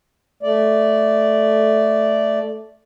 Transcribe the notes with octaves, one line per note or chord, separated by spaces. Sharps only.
A3 D5